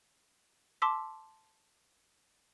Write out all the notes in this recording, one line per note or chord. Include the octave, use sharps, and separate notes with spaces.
A5 C6 D6 E6 B6